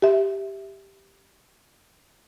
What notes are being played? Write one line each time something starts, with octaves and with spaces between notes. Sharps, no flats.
G4 E5